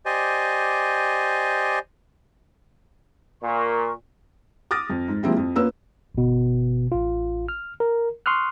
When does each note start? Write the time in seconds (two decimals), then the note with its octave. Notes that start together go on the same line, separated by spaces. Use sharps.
0.06 G4 C5 D5 D#5 G#5
3.42 A#2 A#4 C#6
4.71 D6 D#6 F6 A6 A#6
4.90 F2
5.08 G#2
5.23 F3 G#3 A#3 C4 E4 G4
5.37 F2
5.56 A#3 B3 C#4 F4 E6
6.15 G1 B2
6.92 A1 F4
7.49 F6
7.80 A#4
8.26 C6 C#6 D#6 F6 F#6